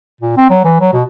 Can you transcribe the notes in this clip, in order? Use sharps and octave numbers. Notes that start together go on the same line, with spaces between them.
A#2
C4
F#3
E3
F#3
B2